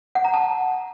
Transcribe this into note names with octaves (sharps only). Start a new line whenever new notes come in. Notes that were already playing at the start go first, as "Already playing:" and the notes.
F#5
A#5
A5